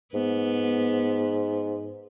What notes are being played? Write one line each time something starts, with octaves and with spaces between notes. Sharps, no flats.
G#2 B3